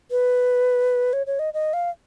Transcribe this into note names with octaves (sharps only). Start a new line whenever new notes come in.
B4
C#5
C#5
D#5
D#5
F5